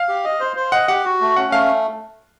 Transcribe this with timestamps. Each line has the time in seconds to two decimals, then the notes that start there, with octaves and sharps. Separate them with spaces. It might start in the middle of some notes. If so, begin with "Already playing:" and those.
Already playing: F5
0.09 G4
0.24 D#5
0.40 C5
0.56 C5
0.72 D#5 F#5
0.88 G4 F#5
1.05 F#4
1.21 A3
1.36 C#4 F#5
1.52 A3 F5